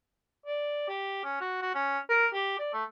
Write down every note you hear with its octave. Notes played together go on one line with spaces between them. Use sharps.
D5
G4
C#4
F#4
F#4
C#4
A#4
G4
D5
A3